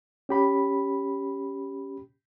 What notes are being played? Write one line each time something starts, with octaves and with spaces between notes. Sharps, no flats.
C#4 G4 B5